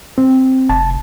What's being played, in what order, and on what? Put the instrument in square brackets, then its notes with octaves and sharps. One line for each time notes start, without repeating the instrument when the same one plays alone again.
[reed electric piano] C4
[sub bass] F1 [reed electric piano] A5